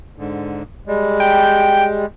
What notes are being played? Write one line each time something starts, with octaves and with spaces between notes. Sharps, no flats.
G#2 D3
G3 G#3
G5